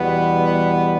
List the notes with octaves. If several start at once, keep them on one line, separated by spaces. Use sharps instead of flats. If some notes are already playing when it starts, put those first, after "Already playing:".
Already playing: E2 B2 G3 B3